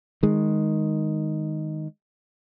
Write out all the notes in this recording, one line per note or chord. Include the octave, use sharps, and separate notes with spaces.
D#3 G#3